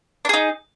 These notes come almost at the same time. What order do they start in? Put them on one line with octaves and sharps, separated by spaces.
D4 G#4 D#4